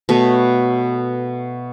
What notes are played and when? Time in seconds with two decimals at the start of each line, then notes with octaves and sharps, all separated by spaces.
0.09 B2 A3 B4 C#5